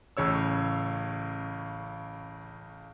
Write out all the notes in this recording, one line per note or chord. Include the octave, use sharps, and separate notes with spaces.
A1 C#3 C#5 E6